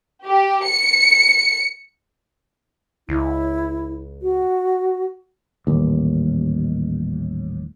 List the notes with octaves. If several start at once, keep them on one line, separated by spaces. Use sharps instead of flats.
G4
C#7
C#2 E4
F#4
D#1 A1 D#2